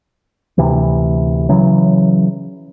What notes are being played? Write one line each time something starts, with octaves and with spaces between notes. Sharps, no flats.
D2 C3 E3
C#3 E3 F#3